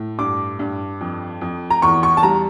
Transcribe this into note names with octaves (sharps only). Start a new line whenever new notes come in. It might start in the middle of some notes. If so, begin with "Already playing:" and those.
Already playing: A2
G2 D6
G2
F2
F2
A#5
E2 C#6
C#6
A5
G3 A#5